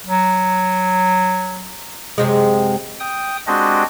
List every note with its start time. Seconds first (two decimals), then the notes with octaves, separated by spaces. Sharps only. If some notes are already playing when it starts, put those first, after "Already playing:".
0.07 F#3
2.18 F#2 C3 G#3
3.00 G5 D#6
3.47 G#3 C4 D4 F#4 G4 D#5